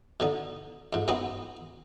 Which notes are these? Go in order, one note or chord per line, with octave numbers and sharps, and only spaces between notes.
B2 D3 D#4
F2 G#2
F#2 F#3 B3 C4 D#4